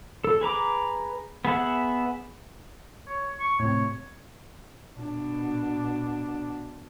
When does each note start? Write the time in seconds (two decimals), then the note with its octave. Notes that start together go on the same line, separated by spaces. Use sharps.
0.24 A4
0.41 G#4 B4 A#5 D6
1.45 B3 G#4 E5 F#5
3.08 C#5
3.40 C#6
3.60 A2 C3 C#5
4.95 B2 D4